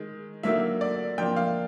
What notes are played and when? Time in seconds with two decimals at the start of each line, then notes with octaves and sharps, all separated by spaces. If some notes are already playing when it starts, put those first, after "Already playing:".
Already playing: D#3 G#3
0.43 D3 F#3 A#3 D#4 E5
0.81 D5
1.18 F3 A#3 D4 G5
1.36 F5